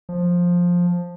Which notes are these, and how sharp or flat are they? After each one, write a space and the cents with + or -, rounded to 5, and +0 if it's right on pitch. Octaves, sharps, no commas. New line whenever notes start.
F3 +10